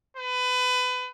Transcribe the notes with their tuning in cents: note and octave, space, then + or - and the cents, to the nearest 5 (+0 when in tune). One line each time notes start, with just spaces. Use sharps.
B4 +25